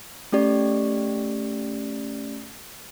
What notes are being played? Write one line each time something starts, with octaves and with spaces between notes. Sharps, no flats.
A3 C#4 G4 D5